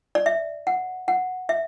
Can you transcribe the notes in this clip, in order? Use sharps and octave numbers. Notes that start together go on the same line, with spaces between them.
D5
E5
F#5
F#5
E5